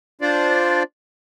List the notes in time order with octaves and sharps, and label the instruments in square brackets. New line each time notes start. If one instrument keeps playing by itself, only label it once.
[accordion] D4 F4 C5 D5